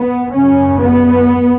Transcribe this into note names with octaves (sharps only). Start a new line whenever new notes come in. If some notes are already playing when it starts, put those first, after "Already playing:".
Already playing: B3
F#2 C#3 C#4
B3